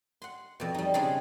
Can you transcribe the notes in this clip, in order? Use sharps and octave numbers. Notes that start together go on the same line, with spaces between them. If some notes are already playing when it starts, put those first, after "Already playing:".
F#5 C6
F2 B2
G3 D#4
C#3 G3 C4 D4 D#4 G#4